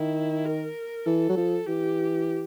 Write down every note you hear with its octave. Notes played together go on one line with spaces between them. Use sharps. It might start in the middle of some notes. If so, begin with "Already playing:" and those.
Already playing: D#3 E4
A#4
E3 A4
F#3
F3
E3 G4